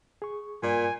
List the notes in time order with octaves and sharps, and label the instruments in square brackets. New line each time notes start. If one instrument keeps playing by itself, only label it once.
[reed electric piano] G#4 C#6
[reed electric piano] G2 D5 [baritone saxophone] A#2 [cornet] G#5